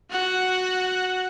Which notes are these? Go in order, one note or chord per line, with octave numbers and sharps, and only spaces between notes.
F#4 F#5